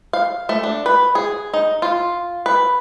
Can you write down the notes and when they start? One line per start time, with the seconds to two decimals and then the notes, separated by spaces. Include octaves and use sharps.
0.13 F5
0.49 A3
0.63 D4
0.86 B4
1.15 G#4
1.54 D#4
1.82 F4
2.46 B4